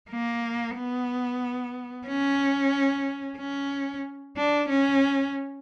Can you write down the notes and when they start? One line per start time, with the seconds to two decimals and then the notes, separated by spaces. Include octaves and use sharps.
0.10 A#3
0.76 B3
2.08 C#4
3.38 C#4
4.37 D4
4.69 C#4